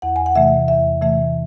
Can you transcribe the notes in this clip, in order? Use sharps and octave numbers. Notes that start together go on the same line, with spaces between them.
E2 F#5
G#5
F#5
C3 E3 A3 E5
E2 E5
C3 E3 A3 E5